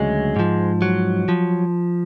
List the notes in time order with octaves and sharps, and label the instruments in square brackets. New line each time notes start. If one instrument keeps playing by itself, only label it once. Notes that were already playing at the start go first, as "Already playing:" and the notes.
Already playing: [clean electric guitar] D2 C#3 F#3 G#3
G#2 F3
F#3
F3